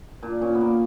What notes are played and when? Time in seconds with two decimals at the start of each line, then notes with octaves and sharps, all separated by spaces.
0.23 A#2 D4
0.41 A#2 C#4
0.55 B3
0.61 A#2 A#3